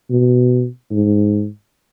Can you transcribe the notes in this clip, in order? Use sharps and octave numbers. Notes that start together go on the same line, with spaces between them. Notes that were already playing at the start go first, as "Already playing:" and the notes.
B2
G#2